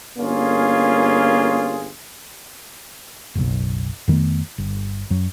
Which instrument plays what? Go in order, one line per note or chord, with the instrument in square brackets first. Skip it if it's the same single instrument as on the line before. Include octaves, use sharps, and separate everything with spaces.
[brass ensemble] G1 A#3 C#4 F4 G#4
[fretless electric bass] F#1 B1
F2 D#3 A3 B3
G1
F#2 F#3